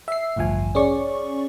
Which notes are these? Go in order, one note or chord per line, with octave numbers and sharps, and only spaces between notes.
E5 C7
A1 D2 G2 F3 G#5
C#4 G#4 D5 C#6